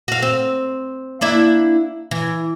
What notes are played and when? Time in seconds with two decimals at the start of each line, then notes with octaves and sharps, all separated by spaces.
0.08 F#4 F5
0.22 C4
1.21 A#3 D4 E4
2.11 E3